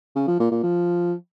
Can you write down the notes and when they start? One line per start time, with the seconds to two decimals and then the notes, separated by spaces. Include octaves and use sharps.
0.16 C#3
0.28 F3
0.39 A#2
0.51 A#2
0.63 F3